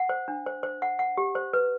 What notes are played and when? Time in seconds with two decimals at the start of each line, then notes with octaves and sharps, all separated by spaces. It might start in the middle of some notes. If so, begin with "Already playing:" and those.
Already playing: F#5
0.09 C5
0.28 D4
0.46 C5
0.63 C5
0.82 F#5
0.99 F#5
1.17 G4
1.35 C5
1.53 B4